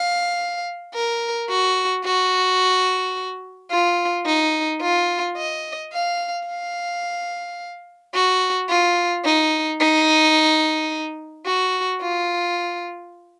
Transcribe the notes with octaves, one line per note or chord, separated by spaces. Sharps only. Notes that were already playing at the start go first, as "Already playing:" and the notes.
Already playing: F5
A#4
F#4
F#4
F4
D#4
F4
D#5
F5
F5
F#4
F4
D#4
D#4
F#4
F4